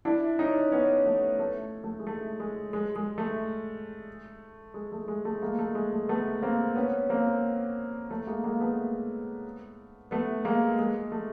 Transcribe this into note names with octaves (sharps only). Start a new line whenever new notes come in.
D4 E4
C#4 D#4
B3 C#4
A3 B3
A3
A3
G#3
A3
G#3
G#3
G#3
A3
G#3
A3
G#3
A3
G#3 A#3
A3
G#3
A3
A3 B3
A#3 C4
B3 C#4
A#3 C4
A3
G#3 A#3
G#3 A#3
A3 B3
A3 B3
G#3 A#3
G#3
A3